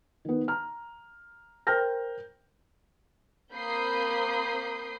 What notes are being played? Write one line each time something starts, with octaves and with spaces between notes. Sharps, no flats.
D#3 B3
A#5 F6
A#4 C5 G5 F6 G6 A#6
A#3 C4 B5 D#6 G6 C7